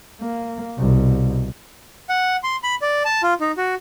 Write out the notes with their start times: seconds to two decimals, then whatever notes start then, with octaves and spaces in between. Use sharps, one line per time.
0.21 A#3
0.78 C2 B2
2.09 F#5
2.43 C6
2.63 B5
2.82 D5
3.05 A5
3.23 F4
3.40 D#4
3.57 F#4